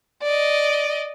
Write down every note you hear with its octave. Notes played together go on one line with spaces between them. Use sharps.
D5 D#5